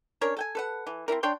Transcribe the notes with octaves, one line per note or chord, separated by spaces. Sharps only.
C#4 D4 A#4 C#5
A4 G5 G#5
A4 B4 F#5
E3
C4 C#4 E4 A#4
D4 C#5 G5 C6